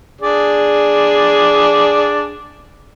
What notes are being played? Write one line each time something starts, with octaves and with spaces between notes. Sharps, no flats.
D4 G#4 D5